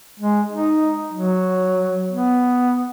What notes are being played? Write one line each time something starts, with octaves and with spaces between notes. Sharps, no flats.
G#3
D#4
F#3
B3